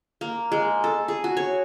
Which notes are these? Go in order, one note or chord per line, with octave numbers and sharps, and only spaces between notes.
A#3
G#3
A4
G#4
F#4
C#5